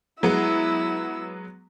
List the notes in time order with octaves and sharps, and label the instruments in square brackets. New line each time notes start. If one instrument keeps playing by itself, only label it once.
[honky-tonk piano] F#3 G#3 B3 [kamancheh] E4 E6